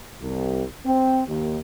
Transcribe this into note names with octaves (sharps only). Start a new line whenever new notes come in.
C2
C4
D#2